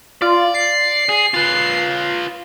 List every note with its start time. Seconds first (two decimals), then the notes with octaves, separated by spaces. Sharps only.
0.22 F4 D5
0.54 C7
1.09 G#4
1.34 F4 B4